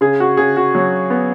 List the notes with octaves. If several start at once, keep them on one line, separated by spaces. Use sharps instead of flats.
C#3 G#4
F#4
C#3 G#4
F#4
F#3
B3